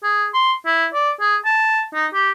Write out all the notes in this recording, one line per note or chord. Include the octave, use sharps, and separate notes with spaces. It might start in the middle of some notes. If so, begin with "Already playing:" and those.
G#4
C6
E4
D5
G#4
A5
D#4
G4